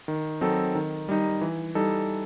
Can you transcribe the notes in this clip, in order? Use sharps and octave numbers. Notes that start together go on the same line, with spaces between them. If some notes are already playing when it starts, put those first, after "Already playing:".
D#3
F#3 C4 D#4 A4
D#3
G3 D#4
E3
G3 D#4 A4